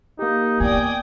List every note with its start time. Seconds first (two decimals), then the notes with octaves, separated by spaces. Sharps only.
0.19 A#3 D#4 G4
0.60 B3 D5 G5 G#5 D#6